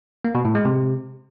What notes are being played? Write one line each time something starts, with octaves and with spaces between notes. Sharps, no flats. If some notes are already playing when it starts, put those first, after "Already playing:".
A#3
B2
A2
G#3
C3